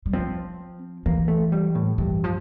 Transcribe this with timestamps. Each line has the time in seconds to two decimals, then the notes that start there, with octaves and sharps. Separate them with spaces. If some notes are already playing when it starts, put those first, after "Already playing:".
0.06 G3
0.13 F3 C4
1.06 E3 A#3
1.28 A3
1.52 G3
1.75 A2
1.98 G2 E3
2.24 F3